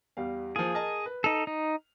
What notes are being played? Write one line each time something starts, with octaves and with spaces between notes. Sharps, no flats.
E2 G3 F5
F3 A#3 F4 G#4
A#4 D#5 A5
B4
D#4 A4 F7
D#4